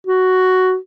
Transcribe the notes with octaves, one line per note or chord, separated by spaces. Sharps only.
F#4